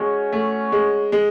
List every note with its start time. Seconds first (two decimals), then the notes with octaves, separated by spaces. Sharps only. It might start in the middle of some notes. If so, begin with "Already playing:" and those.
Already playing: G#3 C#4 F#4 C#5
0.33 A3
0.72 G#3
1.12 G#3